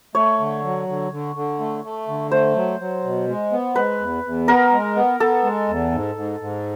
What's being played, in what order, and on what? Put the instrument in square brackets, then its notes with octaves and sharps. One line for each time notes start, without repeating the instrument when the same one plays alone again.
[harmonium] A3 [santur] C#5
[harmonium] D3
F#3
D3
D3
D3
A3
A3
D3
[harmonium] A3 [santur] C5
[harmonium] F#3
F#3
B2
G#3
B3
[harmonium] G#3 [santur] B4
[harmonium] E2
E2
[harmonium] B3 [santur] A#4
[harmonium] G#3
B3
[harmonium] B3 [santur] A4
[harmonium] G#3
E2
G#2
G#2
G#2